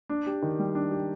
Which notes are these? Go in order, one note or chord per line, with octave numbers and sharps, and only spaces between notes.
D4
G4
D#3
G3
D4
G4